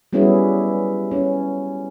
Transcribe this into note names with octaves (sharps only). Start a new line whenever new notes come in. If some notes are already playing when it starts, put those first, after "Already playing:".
F#3 G3 B3 C#4 E4 G#4
C#4